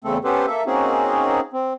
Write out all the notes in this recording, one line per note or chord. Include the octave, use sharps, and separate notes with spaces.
E2 C#3 A3 C4 A4
B3 C#4 G4 A4 B4 C5
A#3 A4 E5
A#3 C4 C#4 D#4 F#4 G#4
C4